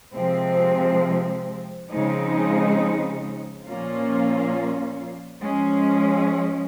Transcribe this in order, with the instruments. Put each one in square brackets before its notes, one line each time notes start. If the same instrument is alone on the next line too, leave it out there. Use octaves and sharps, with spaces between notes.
[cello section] C3 F3 G#3 C4
C#3 F3 G#3 C4 D#4
A#2 F3 A#3 C#4 F4
F3 G#3 C#4